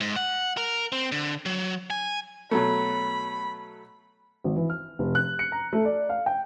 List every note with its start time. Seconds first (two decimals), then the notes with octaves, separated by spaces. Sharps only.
0.01 G#2
0.16 F#5
0.57 A#4
0.92 C4
1.12 D3
1.46 F#3
1.90 G#5
2.51 B2 F#3 A3 B5
4.44 G#1
4.56 E3
4.70 F6
4.99 F1
5.15 F#6
5.39 C#7
5.52 A#5
5.73 A3
5.85 D5
6.09 F5
6.26 G5